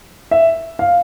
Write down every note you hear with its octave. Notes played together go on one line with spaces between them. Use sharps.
E5
F5